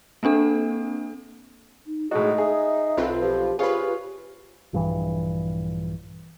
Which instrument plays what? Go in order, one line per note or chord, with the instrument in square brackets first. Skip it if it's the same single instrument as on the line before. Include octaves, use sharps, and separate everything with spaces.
[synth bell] A#3 C4 D4 A4
[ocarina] D#4
[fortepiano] A2 G#3 F#4 [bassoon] D#4 [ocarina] G#4
[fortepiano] G#4 [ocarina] E5
[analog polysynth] B1 F4 B4 [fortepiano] C4 A4
[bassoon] F3 [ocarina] G4
[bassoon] C3 [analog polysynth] F4 B4 [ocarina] G4 [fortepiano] G#4 C#5 F5
[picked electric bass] A#1 G2 E3